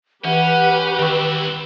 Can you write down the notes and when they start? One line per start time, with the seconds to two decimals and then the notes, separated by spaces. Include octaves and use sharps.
0.25 E3 C#4 G4 B4 F#5
0.99 D#3 C4 E4 G5 C#6